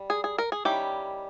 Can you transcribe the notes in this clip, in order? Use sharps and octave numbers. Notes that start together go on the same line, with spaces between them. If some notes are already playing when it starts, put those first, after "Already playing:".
Already playing: G3
G#4
G#4
A#4
G#4
D#3 G3 C#4 E4 G4